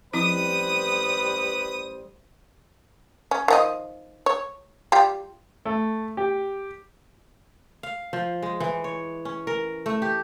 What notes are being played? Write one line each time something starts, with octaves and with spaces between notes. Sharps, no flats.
A1 F3 G3 C4 E4 B4 C5 D#6
C#4
D#3 F3 D#5
C#5
G3 F4 G4
A3
G4
F5
F3
G#3
E3
C#5
C#4
A#4
A3
G4